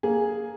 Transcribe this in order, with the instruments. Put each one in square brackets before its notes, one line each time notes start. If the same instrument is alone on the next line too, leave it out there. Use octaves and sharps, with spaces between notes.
[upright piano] A#3 G#4